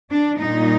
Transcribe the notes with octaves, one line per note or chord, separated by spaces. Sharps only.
D4
A#2 G3 D#4